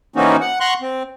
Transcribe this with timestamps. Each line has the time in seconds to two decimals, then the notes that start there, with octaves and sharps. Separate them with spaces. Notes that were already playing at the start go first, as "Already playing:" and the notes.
0.16 E3 A#3 C4 C#4 D#4 F#4
0.41 F#5
0.60 F#5 A#5 C6 C#6 F#6
0.82 C4